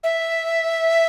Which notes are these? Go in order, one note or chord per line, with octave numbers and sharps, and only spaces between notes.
E5